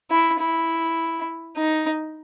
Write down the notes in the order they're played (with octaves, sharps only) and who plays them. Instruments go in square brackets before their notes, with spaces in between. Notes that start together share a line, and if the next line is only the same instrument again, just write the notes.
[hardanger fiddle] E4
E4
D#4